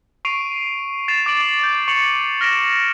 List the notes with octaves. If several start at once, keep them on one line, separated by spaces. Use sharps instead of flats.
C#6 C7 D7 D#7 F7
A6 C7 E7 F7
D6 A6 D7 F#7
G6
C#6 C#7 F7 F#7
F6 A#6 B6 D7 E7